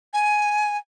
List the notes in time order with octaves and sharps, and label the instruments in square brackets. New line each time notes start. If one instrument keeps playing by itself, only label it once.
[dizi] G#5